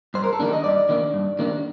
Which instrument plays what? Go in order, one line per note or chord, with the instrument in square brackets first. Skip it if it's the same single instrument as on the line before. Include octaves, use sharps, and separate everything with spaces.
[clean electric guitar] G2 C5
A#4
A4
D#3 A#3 D4 A#4
D#5
G2 D5
D#3 A#3 D4
G2
D#3 A#3 D4